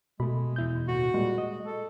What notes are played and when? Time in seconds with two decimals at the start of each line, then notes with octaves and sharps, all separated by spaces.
0.20 B2 G#3 A3 B5
0.56 E2 E4 G6
0.88 D#2 A2 F#4
1.14 A#2 G3 G#3
1.38 D#5
1.65 A4